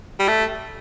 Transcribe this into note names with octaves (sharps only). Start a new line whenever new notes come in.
G3
A3